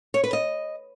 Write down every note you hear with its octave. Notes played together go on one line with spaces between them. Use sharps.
C#5
B4
D#5